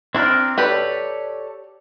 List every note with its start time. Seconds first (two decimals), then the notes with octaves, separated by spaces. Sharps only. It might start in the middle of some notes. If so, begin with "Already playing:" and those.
0.15 C4 D4 E4 A#4 F6
0.58 G4 A4 B4 C#5 D5